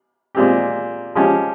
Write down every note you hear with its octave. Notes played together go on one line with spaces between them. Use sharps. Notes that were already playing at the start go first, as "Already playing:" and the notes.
A#2 G#3 C4 G4
F3 G#3 C#4 G4